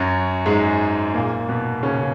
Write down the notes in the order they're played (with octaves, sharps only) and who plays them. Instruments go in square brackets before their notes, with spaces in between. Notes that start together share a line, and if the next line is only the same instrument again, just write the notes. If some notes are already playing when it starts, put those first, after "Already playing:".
Already playing: [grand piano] F#2 F#3
G#2 G#3
A#2 A#3
B2 B3
C#3 C#4